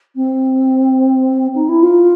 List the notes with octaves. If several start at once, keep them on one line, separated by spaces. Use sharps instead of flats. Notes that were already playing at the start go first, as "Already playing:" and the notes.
C4
D#4
E4
F4